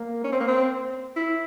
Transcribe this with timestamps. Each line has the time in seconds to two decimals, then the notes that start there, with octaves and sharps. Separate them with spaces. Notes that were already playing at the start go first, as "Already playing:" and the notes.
Already playing: A#3
0.24 C#4
0.32 C4
0.40 A#3
0.48 C4
1.17 E4